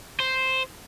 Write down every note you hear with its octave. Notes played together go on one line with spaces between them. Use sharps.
C5